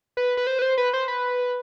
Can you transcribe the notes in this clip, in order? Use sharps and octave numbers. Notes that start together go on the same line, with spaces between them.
B4
B4
C5
B4
C5
B4
C5
B4